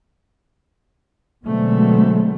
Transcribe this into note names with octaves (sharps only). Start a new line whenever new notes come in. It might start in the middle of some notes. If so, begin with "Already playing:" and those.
B2 D3 F#3 G#3 A3 C4